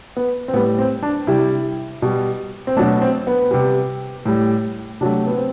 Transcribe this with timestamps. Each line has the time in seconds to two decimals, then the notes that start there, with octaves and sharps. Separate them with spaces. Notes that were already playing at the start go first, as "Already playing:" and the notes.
0.17 B3
0.48 C4
0.53 A2 B3
0.56 G3
0.79 C4
1.03 D4
1.27 C3 G3 E4
2.02 B2 G3
2.67 C4
2.77 B2 F#3 A3 D4
3.02 C4
3.27 B3
3.51 C3 G3
4.25 A2 G3
5.01 C3 F#3 A3 D4
5.26 B3
5.37 C4